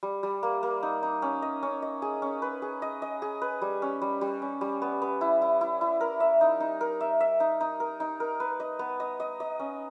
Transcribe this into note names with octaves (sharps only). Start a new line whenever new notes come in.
G3
G3
A#3
A#3
D#4
D#4
C#4
D#5
C#4
D#5
G#4
C#4
B4
G#4
D#5
D#5
G#4
B4
G3
C#4
G3
G3
C#4
G3
B3
B3
E4
E4
E4
E4
A#4
E5
D#4
D#4
A#4
E5
E5
D#4
D#4
A#4
D#4
A#4
B4
D#5
B3
D#5
D#5
D#5
C#4